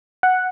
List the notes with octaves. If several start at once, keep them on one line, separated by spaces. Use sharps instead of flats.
F#5